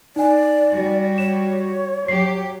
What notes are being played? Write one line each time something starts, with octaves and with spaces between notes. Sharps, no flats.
D#4 D5 G#5
G3 F#4
C#5 E7
F#3 G4 C7